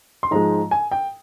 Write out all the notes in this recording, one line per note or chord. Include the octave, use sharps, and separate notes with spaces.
C6
G#2 F3 G#3 A#5
G#5
G5